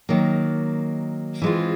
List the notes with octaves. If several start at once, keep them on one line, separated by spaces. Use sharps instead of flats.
D#3 F#3 A#3
E3 G#3 C4 F4